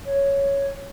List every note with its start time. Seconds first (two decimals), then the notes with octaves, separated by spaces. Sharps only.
0.04 C#5